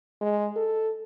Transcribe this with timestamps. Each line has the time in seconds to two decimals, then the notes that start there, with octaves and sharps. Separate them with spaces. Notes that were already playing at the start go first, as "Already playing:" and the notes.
0.21 G#3
0.56 A4